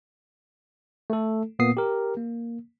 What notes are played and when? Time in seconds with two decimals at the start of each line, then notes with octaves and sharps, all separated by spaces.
1.10 A3 A4
1.59 A#2 A#3 B3 D#6 C7
1.77 G4 A#4
2.17 A#3